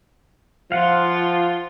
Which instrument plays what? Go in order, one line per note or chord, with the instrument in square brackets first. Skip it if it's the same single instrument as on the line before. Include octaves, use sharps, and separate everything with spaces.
[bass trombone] F3 [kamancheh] F4 C6 [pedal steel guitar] F5 F#5